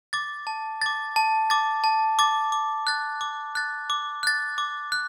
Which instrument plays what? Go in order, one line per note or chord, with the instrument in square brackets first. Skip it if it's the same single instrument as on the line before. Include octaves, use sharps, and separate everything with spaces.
[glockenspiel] D6 A6
A5
D6 A6
A5
D6 A6
A5
D6 A6
D6
F#6 A6
D6
F#6 A6
D6
F#6 A6
D6
F#6